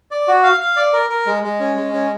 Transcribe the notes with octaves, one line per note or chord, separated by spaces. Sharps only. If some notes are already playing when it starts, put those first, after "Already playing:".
D5
F#4
F5
F5
D5
A#4
A#4
G#3
G#3
C#4
G#3
C#4